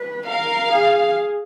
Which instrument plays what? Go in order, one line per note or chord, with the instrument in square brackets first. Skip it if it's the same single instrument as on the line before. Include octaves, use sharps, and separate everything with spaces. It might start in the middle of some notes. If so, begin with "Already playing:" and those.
Already playing: [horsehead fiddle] B4
[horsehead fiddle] A#4 [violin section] F5
[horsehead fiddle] G#4